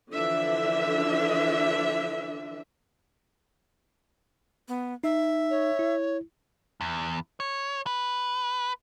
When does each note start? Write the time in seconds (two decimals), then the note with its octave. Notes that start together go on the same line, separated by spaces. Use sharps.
0.13 D3 E3 F3 D4 E5
4.68 B3
5.04 D#4 E5
5.50 C#5
5.79 E4
6.81 E2
7.40 C#5
7.86 B4